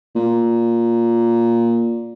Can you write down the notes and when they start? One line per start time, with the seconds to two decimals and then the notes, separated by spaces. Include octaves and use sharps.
0.16 A#2